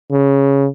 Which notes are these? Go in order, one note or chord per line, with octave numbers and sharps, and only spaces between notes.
C#3